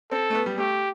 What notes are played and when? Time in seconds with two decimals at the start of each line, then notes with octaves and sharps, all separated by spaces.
0.11 C4 A4
0.30 A3
0.35 B3
0.46 G3
0.58 A3 G4